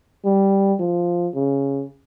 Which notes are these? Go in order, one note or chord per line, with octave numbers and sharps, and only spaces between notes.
G3
F3
C#3